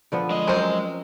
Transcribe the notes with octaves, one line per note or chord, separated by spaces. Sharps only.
D3 F3 B3
G#3 D#5
F#3 C4 C#4 A#4 C5